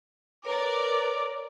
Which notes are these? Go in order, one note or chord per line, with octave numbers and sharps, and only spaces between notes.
A#4 B4 C#5 D5 D6